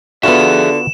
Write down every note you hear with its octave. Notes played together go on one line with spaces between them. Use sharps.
D3 B3 F4 F#4 G#4 E5 E7